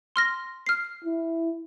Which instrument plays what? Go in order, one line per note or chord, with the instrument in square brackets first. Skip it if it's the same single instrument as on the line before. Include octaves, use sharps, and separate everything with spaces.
[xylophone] C6 F6 A#6
F6 C7
[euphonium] E4